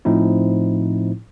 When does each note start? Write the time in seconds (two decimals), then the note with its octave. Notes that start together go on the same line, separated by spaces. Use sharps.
0.05 A2 F3 C4 D#4 E4